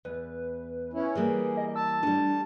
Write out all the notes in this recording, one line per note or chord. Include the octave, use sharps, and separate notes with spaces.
E2 B4
C#4 E4
E3 G3 A#3 G#4 B4
D#5
A5 E6
G3 A3 D4